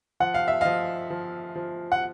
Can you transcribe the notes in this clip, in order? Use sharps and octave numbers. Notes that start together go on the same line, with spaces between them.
F3 F#5
F5
E5
F3 D#5 F5
F3
F3
F#5